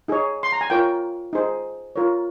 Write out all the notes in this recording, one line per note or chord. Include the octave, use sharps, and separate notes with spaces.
D#4 G#4 C#5
C6
A#5
G#5
F4 A#4 C#5 G5
D#4 G#4 C5
F4 A#4 C#5